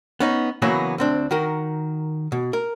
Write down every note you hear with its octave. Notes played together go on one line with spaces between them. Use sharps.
B3 C#4 D#4
C#3 E3 F#3 A#3 B3
D2 C4 D4
D#3 F#4 A#4
B2
A#4